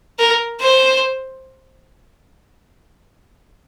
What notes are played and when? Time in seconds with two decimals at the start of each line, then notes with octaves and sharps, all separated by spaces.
0.19 A#4
0.60 C5